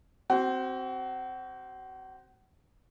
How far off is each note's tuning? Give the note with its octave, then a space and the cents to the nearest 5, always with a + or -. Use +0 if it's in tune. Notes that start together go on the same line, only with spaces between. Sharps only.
C4 +0 F#4 +35